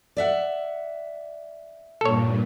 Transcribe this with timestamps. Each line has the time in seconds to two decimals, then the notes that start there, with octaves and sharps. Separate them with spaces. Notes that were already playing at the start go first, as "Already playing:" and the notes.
0.17 D5 E5 F#5
2.01 G2 A#2 A4 C#5